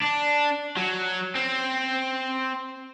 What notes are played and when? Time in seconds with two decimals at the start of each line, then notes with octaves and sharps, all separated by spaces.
0.02 D4
0.77 F#3
1.35 C4